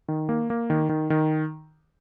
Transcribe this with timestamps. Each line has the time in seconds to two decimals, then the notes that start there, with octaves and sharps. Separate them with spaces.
0.08 D#3
0.29 A#3
0.50 A#3
0.70 D#3
0.89 D#3
1.10 D#3